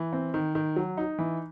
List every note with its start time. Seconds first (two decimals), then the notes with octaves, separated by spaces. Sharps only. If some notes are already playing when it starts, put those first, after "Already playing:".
Already playing: E3
0.13 C4
0.34 D#3
0.55 D#3
0.76 F#3
0.97 D#4
1.19 E3